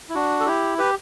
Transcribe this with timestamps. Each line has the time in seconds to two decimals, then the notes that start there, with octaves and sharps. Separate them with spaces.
0.09 E4
0.15 D4 F#4
0.40 A4
0.46 E4 G4
0.78 G4 B4